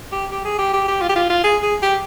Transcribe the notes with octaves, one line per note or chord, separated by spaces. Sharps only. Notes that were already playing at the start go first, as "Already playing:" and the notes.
G4
G4
G#4
G4
G4
G4
F4
G4
F4
F4
G#4
G#4
G4